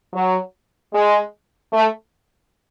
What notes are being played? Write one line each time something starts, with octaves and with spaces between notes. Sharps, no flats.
F#3
G#3
A3